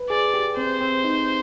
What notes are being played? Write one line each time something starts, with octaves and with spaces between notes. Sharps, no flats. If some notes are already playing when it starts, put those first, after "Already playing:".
Already playing: B4
G#4 D5
G4
C4 C5
C4
D#4